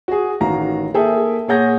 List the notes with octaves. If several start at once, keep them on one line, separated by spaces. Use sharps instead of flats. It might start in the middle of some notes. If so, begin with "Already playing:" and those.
F#4 G#4
A1 D#3 F#4 F5 A#5
A#3 G#4 A4 E5 G5
A#2 G#4 C#5 F#5 G6 A#6